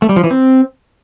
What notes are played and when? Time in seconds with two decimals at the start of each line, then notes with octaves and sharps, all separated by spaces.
0.02 A3
0.09 G3
0.16 F3
0.24 E3
0.31 C4